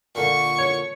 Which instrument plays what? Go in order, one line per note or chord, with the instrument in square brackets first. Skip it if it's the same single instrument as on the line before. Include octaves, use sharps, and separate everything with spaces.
[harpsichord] A#2 D3 [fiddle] C#6
[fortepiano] C#5